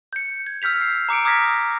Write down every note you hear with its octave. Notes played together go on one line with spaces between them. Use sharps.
G6 C#7
G#6
E6 F6 G6 B6 F7
C7
A#5 D6 C#7 D7
D6 D#6 F6 G#6 A#6 B6